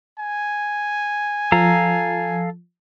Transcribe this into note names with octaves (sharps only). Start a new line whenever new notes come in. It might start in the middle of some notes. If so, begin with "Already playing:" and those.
G#5
F3 A4 F5 A#5